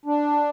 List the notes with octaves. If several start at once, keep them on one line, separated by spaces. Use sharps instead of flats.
D4